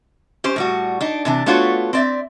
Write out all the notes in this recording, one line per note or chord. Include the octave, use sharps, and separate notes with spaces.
C#4 G4 C5
A2 G3 F#4
D4 D#4
C3 E3 D4
A3 B3 D4 F4 F#4 C#5
C4 D5 E5